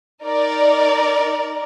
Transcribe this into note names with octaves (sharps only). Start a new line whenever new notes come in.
D#4 A#4 D5